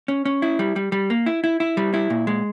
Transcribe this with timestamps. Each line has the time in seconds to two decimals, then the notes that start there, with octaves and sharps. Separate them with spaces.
0.08 C#4
0.25 C#4
0.42 E4
0.59 G3
0.76 G3
0.92 G3
1.10 A#3
1.26 E4
1.44 E4
1.60 E4
1.77 G3
1.94 E4
2.10 A#2
2.27 G#3